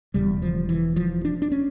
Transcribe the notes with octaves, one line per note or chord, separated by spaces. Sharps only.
E1 E2 C#3 G3
F3
E3
F3
D4
D4
C#4